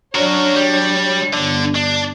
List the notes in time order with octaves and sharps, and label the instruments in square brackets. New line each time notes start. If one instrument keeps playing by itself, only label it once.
[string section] F#3 D4 C#5 [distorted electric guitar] F#4 A#4
[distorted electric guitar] G3
[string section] G1 [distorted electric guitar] D3
[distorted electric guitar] D4